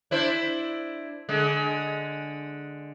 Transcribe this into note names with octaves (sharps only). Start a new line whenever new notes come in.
D4 E4 C5
D3 G#3